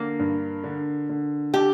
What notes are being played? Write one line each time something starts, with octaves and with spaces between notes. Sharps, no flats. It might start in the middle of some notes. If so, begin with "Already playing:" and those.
Already playing: D3 A#3
G2
D3
D3
D3 G4